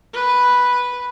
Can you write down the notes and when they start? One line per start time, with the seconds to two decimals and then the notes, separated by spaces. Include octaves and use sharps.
0.14 B4